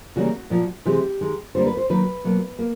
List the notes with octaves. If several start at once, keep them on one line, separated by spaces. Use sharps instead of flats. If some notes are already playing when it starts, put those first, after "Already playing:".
C#3 E3 G3 A#3 F#4
A#2 F3 A#3
C3 E3 G#3 G4
D#3 G#3
D3 G3 A#3 C5
B4
C5
D#3 F#3 A#3 B4
B2 F#3 A#3
A#3